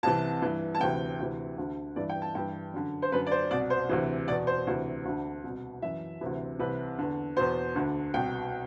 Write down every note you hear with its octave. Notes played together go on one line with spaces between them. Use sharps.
C2 C3 E3 A5
G2 E3
A5
D2 C3 E3 G5
D2 C3 E3
D2 D3
G2 E3 D5
G5
A5
G2 E3 G5
F#2 D3
C5
F#2 D3 B4
D5
C5
C2 B2 D5
C5
D2 C3 E3
E2 B2 D5
C5
D2 C3 E3
D2 D3
C2 B2
F#2 E3 E5
D2 C3 E3
C2 C3 E3 B4
E2 D3
E2 B2 C5
D2 D3
C2 B2 G5